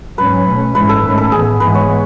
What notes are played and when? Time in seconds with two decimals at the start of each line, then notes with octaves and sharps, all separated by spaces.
0.18 G#2 F#3 C#4 B4
0.47 B2 A3 C#4
0.75 G#2 E3 G#3 C#4 B4
0.89 A4
1.04 G#2 D#3 A3 C#4
1.18 A4
1.32 A2 E3 B3 G#4
1.60 G#2 E3 G#3 B3 B4
1.75 C#5